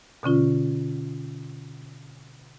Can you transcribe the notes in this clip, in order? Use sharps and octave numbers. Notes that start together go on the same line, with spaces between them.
B2 D3 C#4 F4